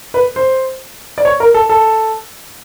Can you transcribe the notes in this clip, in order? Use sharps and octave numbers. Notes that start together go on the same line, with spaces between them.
B4
C5
D5
C#5
A#4
A4
A4